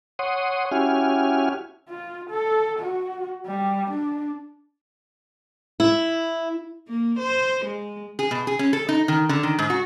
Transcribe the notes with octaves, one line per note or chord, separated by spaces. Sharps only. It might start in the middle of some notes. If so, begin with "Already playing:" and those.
C#5 F#5 C6 D#6
C#4 E4 F#4 G4 G#5 F6
F4
A4
F#4
G3
D4
E4
A#3
C5
G#3
G#4
B2
G#4
C#4
A4
D#4
D#3
D3
D#3
G#2
F#4